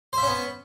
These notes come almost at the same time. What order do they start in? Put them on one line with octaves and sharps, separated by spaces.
C5 E5 C#4 B3